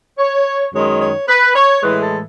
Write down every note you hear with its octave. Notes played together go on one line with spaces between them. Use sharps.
C#5
F#2 D#3 G#3 C#5
C#5
B4
C#5
A2 E3 G#3 B4
A4